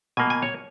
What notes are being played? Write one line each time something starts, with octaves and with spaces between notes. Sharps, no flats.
B2 A#3 G#5
G#5
C#5